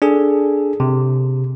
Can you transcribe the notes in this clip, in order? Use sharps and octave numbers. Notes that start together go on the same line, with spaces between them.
D4 G#4 A4
C3